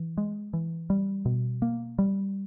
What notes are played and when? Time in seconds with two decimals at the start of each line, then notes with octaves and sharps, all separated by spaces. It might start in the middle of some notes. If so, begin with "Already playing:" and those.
Already playing: E3
0.17 G#3
0.53 E3
0.90 G3
1.26 B2
1.62 A#3
1.99 G3